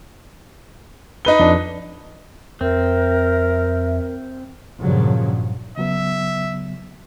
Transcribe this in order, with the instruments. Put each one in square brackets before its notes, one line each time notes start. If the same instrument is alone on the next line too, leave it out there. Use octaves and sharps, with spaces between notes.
[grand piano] D#4 B4 G7
[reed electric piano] F2 D4
[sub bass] F2 [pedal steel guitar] C4 [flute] A#4 [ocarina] E5
[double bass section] G2 A#2 C#3 F3 F#3
[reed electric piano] C#3 F#3 B3 [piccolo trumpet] E5